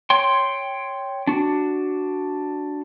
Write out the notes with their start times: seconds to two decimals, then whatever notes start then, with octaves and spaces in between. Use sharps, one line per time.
0.10 C#5 G5 C6
1.27 D4 F#4